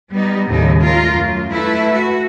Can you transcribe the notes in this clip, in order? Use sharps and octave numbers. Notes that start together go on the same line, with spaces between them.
G3 B3 D#4
D#2 A2 C#3 D#4
A3 F4 A#4
F#2
A3 E4 B4 E5
F#4